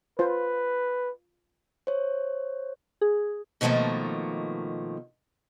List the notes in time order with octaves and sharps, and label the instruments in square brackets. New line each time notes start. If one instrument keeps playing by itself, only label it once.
[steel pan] F4 C5 [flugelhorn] B4
[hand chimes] C5 C#5
[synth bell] G#4
[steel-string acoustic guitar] B2 D#3 F3 A3 A#3